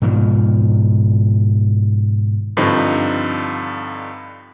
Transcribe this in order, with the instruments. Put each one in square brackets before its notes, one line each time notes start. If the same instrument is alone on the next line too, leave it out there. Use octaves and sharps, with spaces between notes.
[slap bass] G#2 B2 D#3 F3
[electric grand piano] G2 D3 F3 C4 D#4